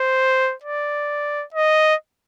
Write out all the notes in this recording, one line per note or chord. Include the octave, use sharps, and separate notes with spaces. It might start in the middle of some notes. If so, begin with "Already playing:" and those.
Already playing: C5
D5
D#5